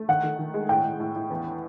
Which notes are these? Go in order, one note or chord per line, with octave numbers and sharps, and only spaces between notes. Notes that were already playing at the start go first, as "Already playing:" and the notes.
Already playing: A3
D#3 F#5
D#3
D#3
G#3
A2 G5
A2
A2
A2
E2